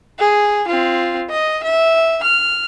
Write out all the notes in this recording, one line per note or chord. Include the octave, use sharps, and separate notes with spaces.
G#4
C4 F4
D#5
E5
F6